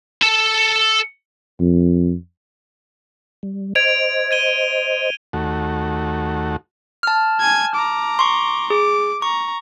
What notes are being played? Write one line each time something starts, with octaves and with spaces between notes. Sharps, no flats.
A4 A5
F2
G3
C5 D#5 G#6 D7 F7
G#6 D#7 G7
D#2 A3 F#4
A5 F6
G#5 G#6
A#5 D6
C6 C#6
G#4 D6
A#5 C#6